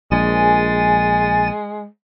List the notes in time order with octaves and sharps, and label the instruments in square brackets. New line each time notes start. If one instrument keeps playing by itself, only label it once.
[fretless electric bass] A#1 [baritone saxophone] G#3 [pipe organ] G#5 A6